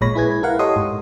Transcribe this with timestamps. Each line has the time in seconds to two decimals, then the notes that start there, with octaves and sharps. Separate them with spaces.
0.01 A#1 A#2 G#3 C#5 B5 A#6
0.15 E4 G#4 B4 G#6
0.43 E4 A#4 F5 F#5
0.59 G4 A4 C#5 D#5 C6 D#6
0.76 G#2